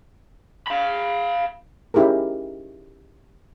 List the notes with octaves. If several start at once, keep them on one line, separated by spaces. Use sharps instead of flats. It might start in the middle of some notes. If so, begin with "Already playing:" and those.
F5 B5
C#4 D#4 E4 G4 G#4 A#4